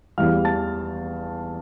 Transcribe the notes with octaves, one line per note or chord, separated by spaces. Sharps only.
E2 E3 G3 F5 F6
A5 A6